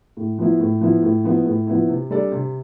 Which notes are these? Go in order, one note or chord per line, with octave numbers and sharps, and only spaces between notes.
A2
F3 B3 E4
A2
F3 B3 E4
A2
F3 B3 E4
A2
F3 B3 E4
C3
G3 D4 A4 D5
C3